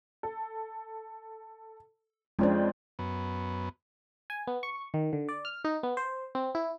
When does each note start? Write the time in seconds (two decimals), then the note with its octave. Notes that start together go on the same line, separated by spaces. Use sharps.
0.23 A4
2.39 F2 G#3 C#4 D4 F4 C5
2.99 F#2 B3
4.30 G#5
4.47 B3
4.63 C#6
4.94 D#3
5.13 D3
5.29 D5
5.45 F6
5.65 D#4
5.83 B3
5.97 C5
6.35 C4
6.55 E4